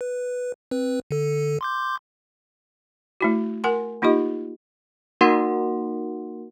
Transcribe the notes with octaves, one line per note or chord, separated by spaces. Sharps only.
B4
C4 B4
D3 A4
C6 D6 G6
A3 E4 F#4
A#4 F#5 G#5 C6
A#3 D#4 F4 G4 D#5
A#3 D#4 F#4 A#4 F#5 C6